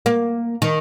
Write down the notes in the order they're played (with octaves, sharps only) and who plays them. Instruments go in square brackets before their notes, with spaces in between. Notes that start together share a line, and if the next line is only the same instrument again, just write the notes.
[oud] A#3
D#3